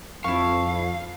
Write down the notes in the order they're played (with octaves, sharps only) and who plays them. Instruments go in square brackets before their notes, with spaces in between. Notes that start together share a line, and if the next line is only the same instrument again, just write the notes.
[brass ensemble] F2 [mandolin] E4 A5 C#6 [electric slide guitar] F5